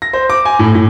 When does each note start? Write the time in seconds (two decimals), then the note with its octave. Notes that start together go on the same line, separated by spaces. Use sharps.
0.02 A#6
0.13 C5
0.30 D6
0.45 G#5
0.59 A2
0.74 A2